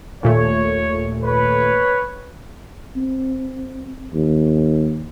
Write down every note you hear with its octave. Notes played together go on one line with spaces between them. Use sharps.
D#2 A#2 A3 C#5
B4 C#5
C4
D#2